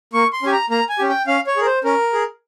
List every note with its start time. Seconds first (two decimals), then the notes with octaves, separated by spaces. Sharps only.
0.14 A#3 C#6
0.33 C6
0.43 C#4 G4 G#5
0.52 A#5
0.70 A#3 A#5
0.89 G#5
0.99 C#4 G4
1.09 G5
1.27 C#4 F5
1.47 C#5
1.57 G#4 A#4
1.66 C5
1.84 C#4 A#4
2.13 G#4